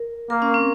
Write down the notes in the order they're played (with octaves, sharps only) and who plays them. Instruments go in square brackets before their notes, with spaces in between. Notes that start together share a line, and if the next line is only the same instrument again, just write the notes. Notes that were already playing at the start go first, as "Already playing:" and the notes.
Already playing: [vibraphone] A#4
[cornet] A#3 [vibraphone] A#4
[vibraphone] C#4
C4